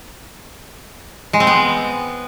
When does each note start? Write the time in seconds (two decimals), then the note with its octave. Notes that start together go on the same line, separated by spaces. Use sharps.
1.33 G#3
1.40 C4
1.47 B3